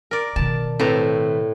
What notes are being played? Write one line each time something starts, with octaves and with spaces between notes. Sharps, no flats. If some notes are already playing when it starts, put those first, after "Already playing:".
A#4 D5
B2 D#3 A5
A2 A3 C4 B4 A5 A#5